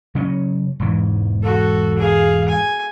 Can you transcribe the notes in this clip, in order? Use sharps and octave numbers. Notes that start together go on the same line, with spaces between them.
C#3 F#3 C#4
E1 G#2 E3
F#4 A4
G#4 F5
G#5